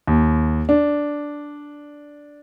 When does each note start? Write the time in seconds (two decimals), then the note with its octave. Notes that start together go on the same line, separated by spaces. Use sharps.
0.07 D#2
0.69 D4